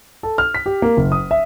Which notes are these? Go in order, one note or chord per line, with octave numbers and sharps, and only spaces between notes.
A4
F6
B6
G4
A#3
F#1
D#6
E5